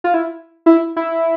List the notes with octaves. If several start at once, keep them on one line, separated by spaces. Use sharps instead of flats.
F4
E4
E4
E4